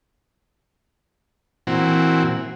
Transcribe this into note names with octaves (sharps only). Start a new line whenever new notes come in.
A#2 E3 C4 F#4